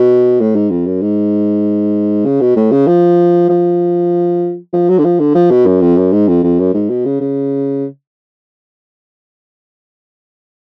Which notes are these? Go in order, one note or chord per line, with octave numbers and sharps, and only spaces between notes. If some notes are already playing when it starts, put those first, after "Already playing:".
Already playing: B2
A2
G#2
F2
F#2
G#2
C#3
B2
A2
C#3
F3
F3
F3
F#3
D3
F3
D3
F3
B2
F#2
F2
F#2
G#2
F2
F2
F#2
G#2
B2
C#3
C#3